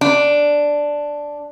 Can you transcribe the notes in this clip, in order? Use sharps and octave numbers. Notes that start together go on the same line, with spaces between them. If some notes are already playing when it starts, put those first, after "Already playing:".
D4